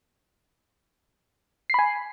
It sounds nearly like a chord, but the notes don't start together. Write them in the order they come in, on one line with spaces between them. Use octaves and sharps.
C7 B5 G#5